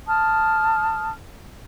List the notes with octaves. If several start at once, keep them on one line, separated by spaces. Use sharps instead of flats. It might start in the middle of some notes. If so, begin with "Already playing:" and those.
A5 D#6 F6